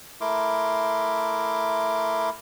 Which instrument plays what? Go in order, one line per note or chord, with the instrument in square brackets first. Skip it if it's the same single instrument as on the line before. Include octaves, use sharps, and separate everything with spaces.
[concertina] A3 E4 A#4 C6 D6